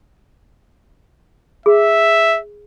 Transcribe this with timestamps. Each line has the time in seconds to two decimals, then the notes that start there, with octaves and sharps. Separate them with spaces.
1.66 G#4 E5